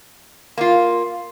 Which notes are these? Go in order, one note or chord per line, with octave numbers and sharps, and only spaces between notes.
A#3 F4